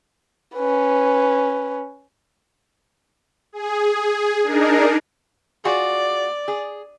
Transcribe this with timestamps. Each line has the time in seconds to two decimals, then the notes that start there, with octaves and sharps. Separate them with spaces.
0.56 C#4 B4
3.53 G#4
4.44 D4 D#4 G#4 A#4
5.65 F4 F#4 G#4 D5
6.48 G#4